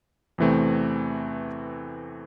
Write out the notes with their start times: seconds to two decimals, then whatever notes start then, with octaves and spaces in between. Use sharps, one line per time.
0.38 E2 C3 E3 A3 C4